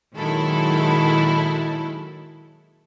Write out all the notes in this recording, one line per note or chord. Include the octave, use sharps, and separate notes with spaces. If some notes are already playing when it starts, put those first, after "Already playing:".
A#2 D#3 F#3 G#3 E4 A4